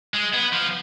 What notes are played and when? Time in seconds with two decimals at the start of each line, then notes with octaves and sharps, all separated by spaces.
0.14 G#3
0.33 B3
0.53 F3